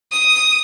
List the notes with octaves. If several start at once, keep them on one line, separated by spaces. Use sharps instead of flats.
D#6